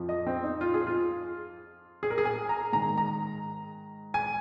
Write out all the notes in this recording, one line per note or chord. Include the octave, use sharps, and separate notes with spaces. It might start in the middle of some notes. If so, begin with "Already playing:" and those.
Already playing: F2 F3
D#5
C4
D#4
F4
G#4
F4
G#4
A#4
G#4
G#5
A#5
G#2 D#3 A#5
A#5
G#5